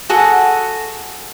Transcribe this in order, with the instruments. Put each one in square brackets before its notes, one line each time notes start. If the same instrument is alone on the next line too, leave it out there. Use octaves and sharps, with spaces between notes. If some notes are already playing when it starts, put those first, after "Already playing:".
[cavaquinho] F#4 G#4 A4 F#5